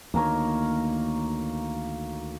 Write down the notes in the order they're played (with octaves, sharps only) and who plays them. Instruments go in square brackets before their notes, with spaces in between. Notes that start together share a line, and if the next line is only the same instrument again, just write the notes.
[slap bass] D2 D#3 [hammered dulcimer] A#3 A#4 C#5